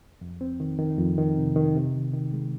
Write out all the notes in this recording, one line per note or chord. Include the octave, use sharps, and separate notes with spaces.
F2
C4
D#3
D#3
F2
D#3
C3
D#3
C3
D#3
D#3
G#3